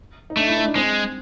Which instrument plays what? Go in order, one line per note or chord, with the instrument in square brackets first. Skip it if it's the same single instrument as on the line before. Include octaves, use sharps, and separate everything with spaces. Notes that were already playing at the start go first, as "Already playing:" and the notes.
[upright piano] D#4
[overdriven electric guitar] A3 [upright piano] D4
[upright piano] E4
D#4
D4
[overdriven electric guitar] G#3 [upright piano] C4